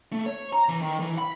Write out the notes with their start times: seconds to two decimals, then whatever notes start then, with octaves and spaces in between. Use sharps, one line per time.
0.12 A3
0.26 C#5
0.53 A#5
0.69 E3
0.82 D#3
1.00 E3
1.18 B5